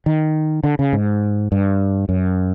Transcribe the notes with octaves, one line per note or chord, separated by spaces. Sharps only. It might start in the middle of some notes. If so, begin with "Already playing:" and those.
D#3
D3
C#3
G#2
G2
F#2